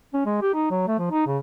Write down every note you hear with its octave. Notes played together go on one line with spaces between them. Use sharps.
C#4
G#3
G4
D#4
F#3
A3
F3
D#4
C#3